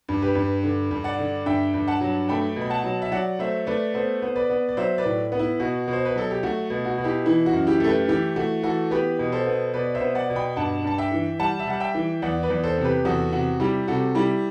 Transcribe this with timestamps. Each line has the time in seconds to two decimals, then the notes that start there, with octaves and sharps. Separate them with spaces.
0.09 G2
0.22 G4 B4
0.35 G2
0.63 D3
0.91 G2
1.04 D5 F#5
1.19 D3
1.46 G2 E5 G5
1.74 G2
1.88 F#5 A5
2.01 F#3
2.29 A3 G5 B5
2.56 B2
2.61 B5
2.70 F#5 A5
2.84 F#3
3.02 E5
3.11 F#3 D5 F#5
3.39 A3 C5 E5
3.66 A3 B4 D5
3.94 B3 A4 C5
4.22 B3 C5
4.36 B4 D5
4.50 B3
4.69 D5
4.77 F#3 C5 E5
4.98 B4 D5
5.05 A2
5.32 B3
5.39 E4
5.60 B2 F#4
5.88 B2
5.93 C5
6.05 B4
6.16 F#3 A4
6.31 G4
6.43 A3 F#4
6.70 B2
6.85 F#4
6.98 B2
7.04 E4 G4
7.26 E3 E4
7.46 F#4
7.53 F#2
7.67 E4 G4
7.80 A3 A4
7.87 G4 B4
8.08 E3 E4 G4
8.36 A3 F#4
8.63 E3 F#4 A4
8.91 B3 G4 B4
9.19 B2
9.32 A4 C5
9.46 B3
9.74 B2 B4 D5
9.95 C5 E5
10.01 B3
10.15 D5 F#5
10.30 B2
10.36 G5 B5
10.56 G2 F#5 A5
10.84 G2 A5
10.98 E5 G5
11.11 E3
11.39 G3 F#5 A5
11.59 E5
11.67 G3 F#5
11.80 E5 G5
11.95 E3
12.22 E2 D5 F#5
12.43 B4 D5
12.50 E2
12.63 A4 C5
12.77 C3
12.84 G4 B4
13.05 E2 F#4 A4
13.32 C3 F#4
13.60 G3 E4 G4
13.88 C3 F#4 A4
14.15 G3 E4 G4